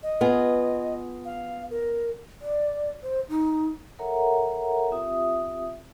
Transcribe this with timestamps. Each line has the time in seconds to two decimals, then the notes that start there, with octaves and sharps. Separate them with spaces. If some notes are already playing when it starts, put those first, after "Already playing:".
0.03 D#5
0.21 B3 F4 G#4
1.25 F5
1.71 A#4
2.41 D5
3.02 C5
3.29 D#4
3.99 A4 A#4 C#5 E5 F#5 A#5
4.92 C4 F4 G4 E5 D#6